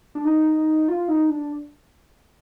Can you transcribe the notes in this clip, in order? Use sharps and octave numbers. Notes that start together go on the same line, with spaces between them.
D4
D#4
F4
D#4
D4